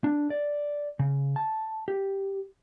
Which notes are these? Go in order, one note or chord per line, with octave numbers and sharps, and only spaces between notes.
D4
D5
C#3
A5
G4